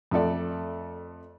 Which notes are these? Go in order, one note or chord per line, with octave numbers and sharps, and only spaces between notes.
F2 A3 A4 D5